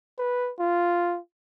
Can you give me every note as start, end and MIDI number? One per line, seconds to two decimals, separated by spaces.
0.18 0.52 71
0.59 1.19 65